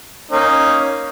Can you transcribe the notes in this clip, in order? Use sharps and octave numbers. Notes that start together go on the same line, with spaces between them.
A#3 C#4 D#4